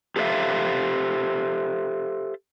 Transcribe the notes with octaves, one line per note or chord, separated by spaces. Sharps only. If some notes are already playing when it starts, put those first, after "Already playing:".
G4 A4 C5 C#5 E5 F5